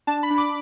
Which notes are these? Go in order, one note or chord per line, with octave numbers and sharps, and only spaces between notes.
D4 A5
B5
D4
D6